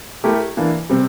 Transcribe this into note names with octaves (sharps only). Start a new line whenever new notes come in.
A3 E4 G4 A#4
E3 A#3 D4
C3 G3 C4